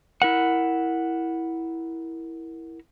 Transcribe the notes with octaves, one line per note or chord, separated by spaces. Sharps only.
E4 A#4 F#5